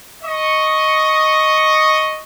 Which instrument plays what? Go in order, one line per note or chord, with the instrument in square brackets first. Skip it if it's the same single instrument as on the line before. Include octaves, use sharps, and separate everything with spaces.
[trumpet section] D#5 C#6